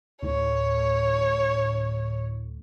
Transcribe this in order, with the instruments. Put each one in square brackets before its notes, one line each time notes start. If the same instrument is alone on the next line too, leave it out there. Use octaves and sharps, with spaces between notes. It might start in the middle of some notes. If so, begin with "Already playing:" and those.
[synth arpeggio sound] D2 A2 [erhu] C#5